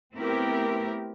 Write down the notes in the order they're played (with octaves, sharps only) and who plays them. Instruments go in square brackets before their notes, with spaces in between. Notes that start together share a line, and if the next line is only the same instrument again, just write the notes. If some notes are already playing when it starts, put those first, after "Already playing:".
[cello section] A3 B3 C4 E4 G4 A#4